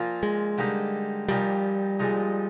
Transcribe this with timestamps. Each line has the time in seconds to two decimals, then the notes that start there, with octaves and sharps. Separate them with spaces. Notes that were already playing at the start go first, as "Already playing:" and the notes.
Already playing: A#2 F3 A#3 F4
0.23 G#3
0.58 D3 G3 A#3 D#4 G4
1.29 A#2 F3 G3 A#3 D#4 G4
1.99 A#2 F3 G#3 D#4